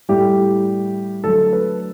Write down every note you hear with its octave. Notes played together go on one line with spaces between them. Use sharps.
A2 G3 G4
D3 F#3 A3 A4
B4